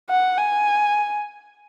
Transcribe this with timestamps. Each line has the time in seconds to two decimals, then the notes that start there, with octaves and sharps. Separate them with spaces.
0.10 F#5
0.38 G#5